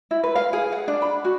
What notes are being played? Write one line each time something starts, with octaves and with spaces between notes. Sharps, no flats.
E4
B4
F5
G#4
F#5
D4
B5
F#4